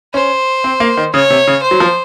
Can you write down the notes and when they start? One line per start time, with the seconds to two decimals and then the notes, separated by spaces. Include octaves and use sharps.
0.14 C#4 C5
0.64 C4
0.80 A#3
0.97 D#3
1.14 C#3 C#5
1.30 C3
1.47 C#3
1.63 C5
1.71 F#3
1.80 F3